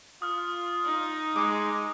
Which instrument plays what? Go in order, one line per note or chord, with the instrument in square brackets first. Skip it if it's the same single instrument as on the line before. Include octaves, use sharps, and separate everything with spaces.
[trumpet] F4 [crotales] D#6 F6
[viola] D#4
[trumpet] G#3 [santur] D6